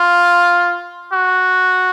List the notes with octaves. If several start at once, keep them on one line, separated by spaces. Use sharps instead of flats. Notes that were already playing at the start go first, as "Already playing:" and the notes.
Already playing: F4
F#4